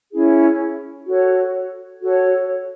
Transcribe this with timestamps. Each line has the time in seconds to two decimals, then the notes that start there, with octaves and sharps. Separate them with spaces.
0.13 C#4 E4 G#4
1.07 F#4 A4 C#5
2.01 F#4 A4 C#5